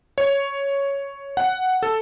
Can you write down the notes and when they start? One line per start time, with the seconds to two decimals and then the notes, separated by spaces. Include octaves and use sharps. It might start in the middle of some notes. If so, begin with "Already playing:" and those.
0.18 C#5
1.37 F#5
1.83 A4